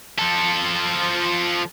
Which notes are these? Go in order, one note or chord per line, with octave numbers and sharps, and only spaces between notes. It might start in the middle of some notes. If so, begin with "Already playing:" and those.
F3 A4